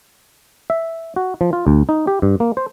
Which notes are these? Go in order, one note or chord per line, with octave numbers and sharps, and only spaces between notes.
E5
F#4
F3
F4
D2
D#4
G4
G2
A#3
C5